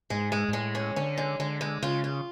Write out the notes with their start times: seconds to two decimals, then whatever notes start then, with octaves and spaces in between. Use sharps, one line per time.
0.10 G#2 G#3
0.32 G#3
0.49 G#2
0.53 A2 G#3
0.75 C#4
0.96 D3 C#4
1.18 G#3
1.40 D3 G#3
1.61 G#3
1.83 C#3 F4
2.04 F4